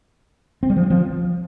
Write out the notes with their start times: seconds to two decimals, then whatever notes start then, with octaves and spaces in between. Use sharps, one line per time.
0.63 C4
0.70 G3
0.77 F3
0.83 C4
0.90 F3